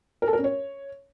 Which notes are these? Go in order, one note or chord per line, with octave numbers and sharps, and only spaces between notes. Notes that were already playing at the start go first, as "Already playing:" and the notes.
A#4
A4
A#4
C#4
C#5